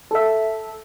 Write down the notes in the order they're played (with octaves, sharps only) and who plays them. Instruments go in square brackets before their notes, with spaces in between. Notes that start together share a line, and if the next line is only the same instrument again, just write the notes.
[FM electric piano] A4 E5